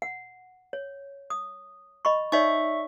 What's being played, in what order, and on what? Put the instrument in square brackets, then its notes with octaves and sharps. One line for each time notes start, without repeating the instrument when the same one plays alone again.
[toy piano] F#5
C#5
D#6
D#5 B5 C#6
[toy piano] D#4 C#5 D5 [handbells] E5 C#6